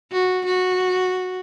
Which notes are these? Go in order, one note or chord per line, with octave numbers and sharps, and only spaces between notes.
F#4
F#4